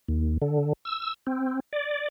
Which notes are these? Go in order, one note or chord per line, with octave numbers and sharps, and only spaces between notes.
D#2
D3
E6
C4
D5